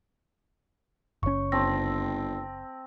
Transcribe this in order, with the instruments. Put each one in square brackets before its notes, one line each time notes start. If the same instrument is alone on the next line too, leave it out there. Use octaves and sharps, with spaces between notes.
[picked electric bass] F#1 C#4 [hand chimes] C#5 C#6
[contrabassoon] G1 [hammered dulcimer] C4 [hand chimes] A5 A#6